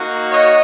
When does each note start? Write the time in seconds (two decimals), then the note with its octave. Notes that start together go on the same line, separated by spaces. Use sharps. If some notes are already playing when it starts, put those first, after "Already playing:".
Already playing: A#3 D#4 F#4
0.31 C#5 D#5